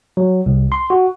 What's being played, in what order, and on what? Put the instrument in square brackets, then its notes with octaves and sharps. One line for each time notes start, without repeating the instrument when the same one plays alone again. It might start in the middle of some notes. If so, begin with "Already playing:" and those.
[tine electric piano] F#3
C2
C6
F#4